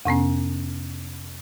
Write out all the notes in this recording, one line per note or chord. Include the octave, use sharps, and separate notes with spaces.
F2 C3 B3 C#4